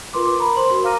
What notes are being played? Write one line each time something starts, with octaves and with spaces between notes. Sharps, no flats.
F4 A#4 B4 C6 D6
D6
A#4 A#5 B5
C5 C6 F#7
F#4 A#4
F5 A#5 D6 F6 A#6 D#7